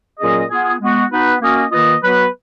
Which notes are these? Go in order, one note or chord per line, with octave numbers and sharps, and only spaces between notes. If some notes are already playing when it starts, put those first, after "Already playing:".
A#2 F#3 C#4 G#4 D#5
B3 F4 G#4
G#3 B3 F#4
B3 D#4 F#4 B4
A#3 C#4 F#4 A#4 D#5
D#3 A#3 F4 B4 D#5
F#3 B3 F#4 B4